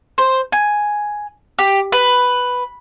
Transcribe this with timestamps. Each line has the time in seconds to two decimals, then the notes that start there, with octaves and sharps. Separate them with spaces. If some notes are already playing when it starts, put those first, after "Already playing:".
0.18 C5
0.52 G#5
1.59 G4
1.92 B4